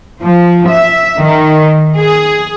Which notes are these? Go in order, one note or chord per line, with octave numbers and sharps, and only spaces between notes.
F3
E5
D#3
G#4